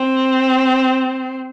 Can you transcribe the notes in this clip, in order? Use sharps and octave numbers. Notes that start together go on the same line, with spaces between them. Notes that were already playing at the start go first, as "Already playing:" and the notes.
Already playing: C4